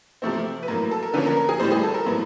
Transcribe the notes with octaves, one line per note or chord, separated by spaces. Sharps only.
C3 F3 A3 C4
B4
A2 F#3 A#3 A#4
A4
A#4
D3 F3 A#3 C#4 B4
A#4
A#4
G#4
A2 E3 G3 C5
G#4
A4
A#4
A2 F#3 B3